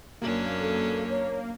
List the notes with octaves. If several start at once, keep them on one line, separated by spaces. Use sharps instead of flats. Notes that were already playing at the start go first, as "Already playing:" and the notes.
F#2 A#3 C#4 D4
A4
C#5